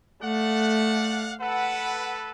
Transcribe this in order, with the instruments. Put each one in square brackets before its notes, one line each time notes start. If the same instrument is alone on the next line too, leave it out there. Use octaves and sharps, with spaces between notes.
[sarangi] A3 [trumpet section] D5 F5 F#5
[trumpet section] A4 B4 [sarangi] F#5